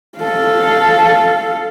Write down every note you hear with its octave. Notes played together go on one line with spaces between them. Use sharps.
A4 F5